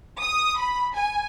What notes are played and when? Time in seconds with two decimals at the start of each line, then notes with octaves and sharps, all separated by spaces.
0.20 D#6
0.60 B5
0.94 G#5